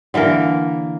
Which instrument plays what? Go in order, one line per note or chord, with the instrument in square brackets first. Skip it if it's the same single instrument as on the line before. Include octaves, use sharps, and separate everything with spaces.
[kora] D3 E3 A#3 A#4